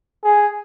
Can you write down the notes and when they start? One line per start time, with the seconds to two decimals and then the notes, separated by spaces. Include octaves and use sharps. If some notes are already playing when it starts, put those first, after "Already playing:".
0.23 G#4